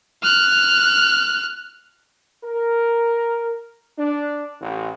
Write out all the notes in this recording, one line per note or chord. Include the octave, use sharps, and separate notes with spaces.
F6 F#6
A#4
D4
A1